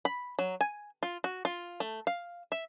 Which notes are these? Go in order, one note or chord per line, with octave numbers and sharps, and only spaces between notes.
B5
F#3
G#5
F4
F#4
F4
A3
F5
E5